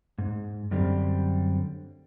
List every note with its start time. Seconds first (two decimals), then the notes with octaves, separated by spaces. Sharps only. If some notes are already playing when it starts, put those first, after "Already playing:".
0.18 G#2
0.71 F#2 D3 G3 C4